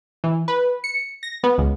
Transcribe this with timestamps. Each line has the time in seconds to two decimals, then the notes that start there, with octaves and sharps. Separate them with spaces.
0.24 E3
0.48 B4
0.84 C#7
1.23 A#6
1.44 B3
1.58 C#2